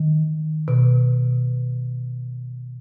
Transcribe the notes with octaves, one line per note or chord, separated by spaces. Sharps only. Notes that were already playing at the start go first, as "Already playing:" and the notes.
Already playing: D#3
B2